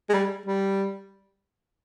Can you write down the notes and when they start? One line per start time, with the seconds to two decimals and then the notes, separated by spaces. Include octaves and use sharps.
0.09 G#3
0.14 G3
0.46 G3